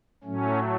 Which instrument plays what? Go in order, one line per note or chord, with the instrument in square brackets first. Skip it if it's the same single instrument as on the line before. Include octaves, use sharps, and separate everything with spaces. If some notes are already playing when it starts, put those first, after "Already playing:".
[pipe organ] A2 F#3 A3 C#4